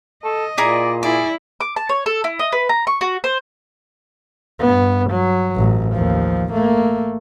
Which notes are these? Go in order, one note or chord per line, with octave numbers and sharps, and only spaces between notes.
A4 D#5
A#2 E4 G#4 D5 A#5
E4 G#4 D5
D6
A5
C#5
A4
E4
D#5
B4
A#5
C#6
F#4
C5
G2 B3
F#3
A1
D#2 F3
A3 A#3